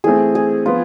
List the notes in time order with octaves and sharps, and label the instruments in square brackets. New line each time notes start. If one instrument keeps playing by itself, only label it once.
[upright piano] E3 A3 C4 [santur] G#4
[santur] G#4
[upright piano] F3 B3 [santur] F4